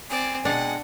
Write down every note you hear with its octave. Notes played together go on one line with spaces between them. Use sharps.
C4 D5 G#5
B2 G#3 D4 F#5 G5